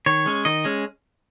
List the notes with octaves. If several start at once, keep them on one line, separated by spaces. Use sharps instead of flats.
D#3 C#5
G#3 C#4
D#3 D#5
G#3 C#4